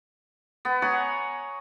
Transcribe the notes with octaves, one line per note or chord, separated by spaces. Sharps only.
B3
C#5 F#5 G#5 A#5